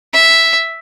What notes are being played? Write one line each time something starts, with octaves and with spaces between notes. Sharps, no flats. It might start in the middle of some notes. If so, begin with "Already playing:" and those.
E5